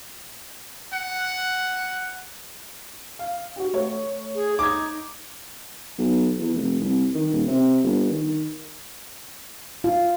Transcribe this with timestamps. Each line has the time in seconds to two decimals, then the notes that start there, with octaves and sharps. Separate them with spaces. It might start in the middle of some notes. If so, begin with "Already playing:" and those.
0.94 F#5
3.19 F5
3.56 F#4 G4
3.73 A3 C#5
4.35 G#4
4.59 D#4 D6 G#6
5.98 B1
6.39 E2
6.54 F1
6.80 C2
7.15 D#3
7.33 D#1
7.48 C3
7.83 G1
8.10 D#3
9.84 F4